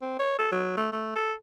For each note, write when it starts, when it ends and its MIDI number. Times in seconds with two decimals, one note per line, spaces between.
0.02 0.16 60
0.19 0.35 73
0.39 0.50 69
0.52 0.74 54
0.77 0.89 57
0.92 1.15 57
1.15 1.33 69